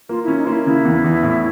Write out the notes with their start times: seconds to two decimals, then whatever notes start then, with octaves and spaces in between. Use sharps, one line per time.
0.09 A#3 F4
0.23 C#4 E4
0.38 D#4
0.45 A#3 F4
0.52 E4
0.66 C#3 E4
0.85 E2
1.04 E2
1.23 A2